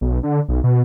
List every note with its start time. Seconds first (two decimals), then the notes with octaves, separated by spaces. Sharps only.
0.01 B1
0.23 D3
0.48 B1
0.64 B2